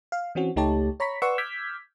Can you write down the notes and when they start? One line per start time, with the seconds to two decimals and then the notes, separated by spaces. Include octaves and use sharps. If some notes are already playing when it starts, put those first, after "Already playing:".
0.12 F5
0.35 E3 C4 C#4 F#4
0.56 C#2 A3 D#4 G4 C#5 A5
1.00 C#5 A#5 B5 C#6 B6
1.22 B4 D5 F#5 C6 C#6 E6
1.38 D6 E6 F6 G6 G#6 B6